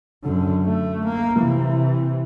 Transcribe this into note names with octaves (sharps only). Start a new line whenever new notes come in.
F#2 D3
A3
A#3
C3 E3